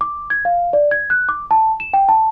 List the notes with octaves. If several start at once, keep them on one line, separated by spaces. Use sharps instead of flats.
D6
G#6
F5
D5
G#6
F#6
D6
A5
E7
G5
A5